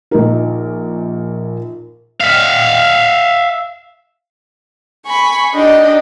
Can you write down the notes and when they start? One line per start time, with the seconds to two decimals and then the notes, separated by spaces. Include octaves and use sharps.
0.11 A#1 D#4 A#4
2.21 E5 F5
5.06 G#5 B5 C#6
5.54 D4 D#4 G4 D#5